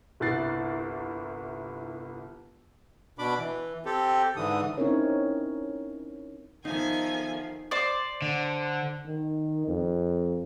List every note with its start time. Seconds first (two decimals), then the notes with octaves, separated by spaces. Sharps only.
0.20 G1 C2 E4 F#6 A6 C7
3.19 B2 D4 B5 D6
3.39 E3
3.86 C4 G4 A4
4.37 G#2 D3 E3 D#6
4.77 C4 C#4 D#4 E4 A#4 C#5
6.65 D#3 F3 B3 D#4 A4 E5 F5 G#5
7.71 C5 D5
8.22 D3
9.05 D#3
9.67 F2